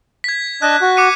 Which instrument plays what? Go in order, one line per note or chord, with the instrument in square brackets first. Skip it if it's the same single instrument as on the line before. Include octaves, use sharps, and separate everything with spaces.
[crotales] G#6 B6
[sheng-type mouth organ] D4 D#5 A5 [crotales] F#6
[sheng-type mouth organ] F#4
[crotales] D6 C#7 D#7